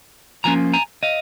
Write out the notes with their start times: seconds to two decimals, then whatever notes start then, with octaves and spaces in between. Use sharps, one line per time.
0.44 F3 A#3 C#4 F4 G#5 A#5
0.73 G#5 A#5
1.03 D#5 F5